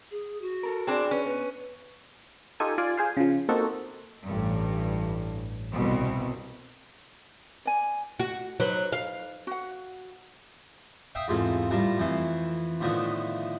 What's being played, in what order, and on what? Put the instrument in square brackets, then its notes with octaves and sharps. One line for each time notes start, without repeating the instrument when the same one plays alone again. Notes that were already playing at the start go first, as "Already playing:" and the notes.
[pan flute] G#4
F#4
[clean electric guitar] A4 A#4
[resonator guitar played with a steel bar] C4 D4 [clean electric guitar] G#4 C#5 D5
[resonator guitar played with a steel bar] C#4 [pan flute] B4
[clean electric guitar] B2 [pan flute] B4
[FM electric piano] D#4 F4 G4 A4 G#5
F4 D5 G#5
G#4 C5 F5
C#3 F3
A#3 C4 D#4 F#4 A4
[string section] A1 G2
C2 B2
[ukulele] D5 G#5
[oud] F#4 [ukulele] F#5
[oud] F#3 [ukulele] D#4 B4 C5
[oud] F5
[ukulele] F#4 F#5
[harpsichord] E5 F5 G5 D#6
E2 G#2 C3 F4 A4
A2 G3 F4 A#4 A5
F2 E3 A3 C6
A2 D3 D#3 F3 A3 B3